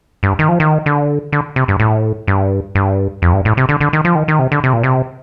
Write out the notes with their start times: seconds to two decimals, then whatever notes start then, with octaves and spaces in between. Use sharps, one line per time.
0.23 G2
0.39 D#3
0.49 F3
0.60 D#3
0.86 D3
1.32 D3
1.56 C3
1.68 G2
1.80 A2
2.27 G2
2.75 G2
3.22 F2
3.33 G2
3.45 A2
3.57 C3
3.69 D3
3.80 D3
3.93 D#3
4.05 F3
4.15 D#3
4.28 D#3
4.39 C3
4.52 D3
4.64 C3
4.73 A#2
4.83 C3